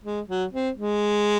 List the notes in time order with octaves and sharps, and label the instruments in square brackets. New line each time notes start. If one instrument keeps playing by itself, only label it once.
[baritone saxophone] G#3
F#3
C4
G#3